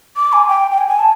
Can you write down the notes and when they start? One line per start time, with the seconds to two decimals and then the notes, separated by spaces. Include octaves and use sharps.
0.17 D6
0.33 G#5
0.48 G5
0.71 G5
0.78 G#5
0.89 G#5
0.99 A5